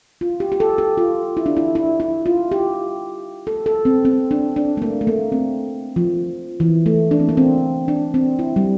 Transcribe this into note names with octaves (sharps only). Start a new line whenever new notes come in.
F4
G4
G4
A4
G4
F4
E4
D4
E4
E4
E4
F4
G4
A4
A4
C4
C4
D4
D4
A3
A#3
A3
A#3
C4
F3
E3
A3
D4
C4
A#3
C4
D4
C4
E4
G3